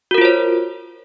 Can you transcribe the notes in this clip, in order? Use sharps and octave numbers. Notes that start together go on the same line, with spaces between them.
F4 F#4 A#4 C5 C#5